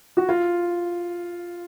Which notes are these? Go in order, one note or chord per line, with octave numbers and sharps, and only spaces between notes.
F#4
F4